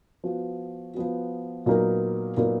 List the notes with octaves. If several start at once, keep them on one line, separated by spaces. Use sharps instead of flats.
F3 B3 F#4
F3 B3 F#4
A#2 F#3 B3 D#4 A#4
A#2 F#3 B3 D#4 A#4